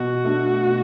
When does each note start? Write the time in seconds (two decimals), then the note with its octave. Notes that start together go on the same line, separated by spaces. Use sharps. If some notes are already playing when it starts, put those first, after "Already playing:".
Already playing: B2 F#4
0.24 A3 D4
0.66 B2